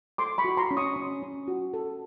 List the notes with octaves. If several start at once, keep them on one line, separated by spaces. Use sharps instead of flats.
A4 C6 D6
B5 C#6
F#4
A#5 C6
C#4
C#6 D#6
C#4
C#4
F#4
A4